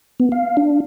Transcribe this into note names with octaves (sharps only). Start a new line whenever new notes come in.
B3
F5
D4